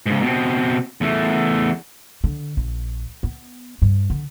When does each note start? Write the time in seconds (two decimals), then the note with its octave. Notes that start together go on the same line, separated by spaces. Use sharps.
0.06 G#2 C#3
0.22 B2 C4
1.01 E2 A3
2.24 D3
2.57 A#1
3.23 B3
3.82 G2
4.10 D3